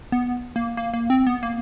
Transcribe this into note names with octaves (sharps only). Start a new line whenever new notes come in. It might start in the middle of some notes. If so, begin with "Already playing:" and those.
B3
A#3
A#3
A#3
C4
B3
A#3